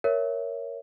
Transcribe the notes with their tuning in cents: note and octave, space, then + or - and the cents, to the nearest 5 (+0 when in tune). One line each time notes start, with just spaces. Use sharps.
A#4 +5 C#5 +0 E5 +0